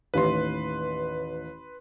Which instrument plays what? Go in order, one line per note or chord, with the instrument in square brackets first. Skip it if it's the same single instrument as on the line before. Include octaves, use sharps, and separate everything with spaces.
[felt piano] A1 D#2 [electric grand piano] B4 C6